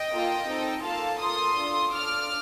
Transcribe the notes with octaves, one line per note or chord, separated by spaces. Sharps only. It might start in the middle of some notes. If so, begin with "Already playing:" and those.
Already playing: D#5 G5
A#3 F4 A4
C4 D#4 A4
A#3 F4 A4 F5 A5
A#3 F4 A4 C6 D#6
D4 F4 A4
D4 F4 A4 D6 F6